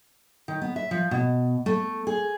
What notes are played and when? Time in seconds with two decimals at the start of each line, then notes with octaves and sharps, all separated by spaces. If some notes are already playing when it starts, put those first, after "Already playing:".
0.48 D#3
0.62 B3
0.76 E5
0.91 F3
1.11 B2
1.66 A3
2.07 G#4